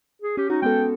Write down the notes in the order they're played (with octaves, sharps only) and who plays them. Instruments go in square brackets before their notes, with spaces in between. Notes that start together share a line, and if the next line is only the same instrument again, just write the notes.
[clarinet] G#4
[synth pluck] C#4 [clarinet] G4
[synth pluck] C#4 F#4 [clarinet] D#4
[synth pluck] G#3 B3 A4 [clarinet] G5